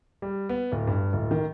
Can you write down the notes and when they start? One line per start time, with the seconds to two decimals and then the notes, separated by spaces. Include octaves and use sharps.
0.22 G3
0.49 B3
0.72 D1
0.87 G2
1.13 D1
1.31 D#3